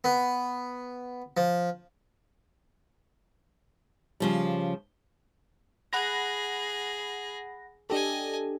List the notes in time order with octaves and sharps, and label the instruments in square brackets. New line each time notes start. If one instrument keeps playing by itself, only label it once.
[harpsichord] B3
F3
[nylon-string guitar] C#3 F3 G3
[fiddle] G#4 [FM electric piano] F#5 B5 A#6
[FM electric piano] D4 G4 A4 [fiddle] D#5 G#5